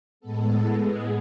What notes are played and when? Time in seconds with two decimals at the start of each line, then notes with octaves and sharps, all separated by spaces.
0.20 A2 G#3 B3 A4
0.82 G#4